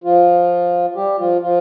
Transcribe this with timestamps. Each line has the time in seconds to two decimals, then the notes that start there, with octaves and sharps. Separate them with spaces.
0.04 F3 F4
0.96 G3 G4
1.18 F3 F4
1.41 F3 F4